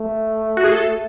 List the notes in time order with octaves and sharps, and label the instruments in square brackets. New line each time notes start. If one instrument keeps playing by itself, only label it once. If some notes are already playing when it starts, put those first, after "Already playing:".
Already playing: [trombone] A3
[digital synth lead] F#4
G#4
A4